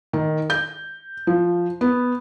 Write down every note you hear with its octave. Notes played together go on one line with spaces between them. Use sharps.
D#3
G6
F3
B3